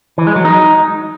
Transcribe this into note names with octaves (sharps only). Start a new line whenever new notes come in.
E3
G#3
F#3
D#4